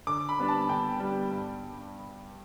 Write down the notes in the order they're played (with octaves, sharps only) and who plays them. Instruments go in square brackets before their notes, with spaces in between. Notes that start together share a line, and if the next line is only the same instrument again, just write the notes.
[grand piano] D3 D6
B5
G3 B3 D4
A5
D3 G5
G3 B3 D4
G2